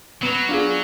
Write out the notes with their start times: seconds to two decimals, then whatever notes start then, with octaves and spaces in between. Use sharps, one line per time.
0.22 F#3 B3
0.49 D4 F4 G#4